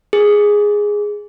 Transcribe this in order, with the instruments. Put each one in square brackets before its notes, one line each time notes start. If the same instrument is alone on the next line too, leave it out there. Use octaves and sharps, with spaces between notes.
[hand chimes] G#4